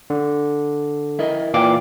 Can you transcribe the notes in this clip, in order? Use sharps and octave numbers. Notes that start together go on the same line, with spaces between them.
D3
E4 A#4 D#5
A#2 E3 F5 G5 D6